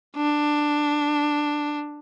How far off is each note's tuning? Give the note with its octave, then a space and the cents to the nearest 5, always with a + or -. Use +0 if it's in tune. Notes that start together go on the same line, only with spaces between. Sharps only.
D4 +10